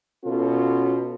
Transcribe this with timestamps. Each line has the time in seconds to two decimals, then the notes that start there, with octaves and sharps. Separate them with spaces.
0.25 B2 C#4 F4 A4